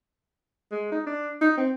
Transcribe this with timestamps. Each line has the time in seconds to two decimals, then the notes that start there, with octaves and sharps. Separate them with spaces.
0.72 G#3
0.92 D#4
1.06 D4
1.41 D#4
1.57 C4